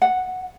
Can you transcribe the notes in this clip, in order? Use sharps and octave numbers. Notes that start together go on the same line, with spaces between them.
F#5